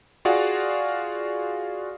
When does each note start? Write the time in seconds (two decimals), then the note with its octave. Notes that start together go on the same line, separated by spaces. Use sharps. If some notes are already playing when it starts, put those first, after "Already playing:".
0.25 F4 F#4 G#4 D5 F5 F#5